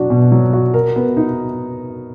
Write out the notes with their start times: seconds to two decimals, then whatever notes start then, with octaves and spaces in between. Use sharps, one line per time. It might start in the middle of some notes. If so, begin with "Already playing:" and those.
Already playing: B2 F#3 D4 F#4
0.10 B2
0.32 F#3
0.53 F#4
0.74 A#4
0.96 B3
1.17 D#4